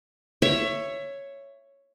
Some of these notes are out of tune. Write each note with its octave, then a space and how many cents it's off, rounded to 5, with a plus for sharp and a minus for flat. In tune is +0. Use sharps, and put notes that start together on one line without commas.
C#5 +0 E5 +20